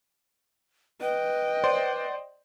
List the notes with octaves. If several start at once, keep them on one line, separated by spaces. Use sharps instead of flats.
B4 D#5 G5
C5 D5 C6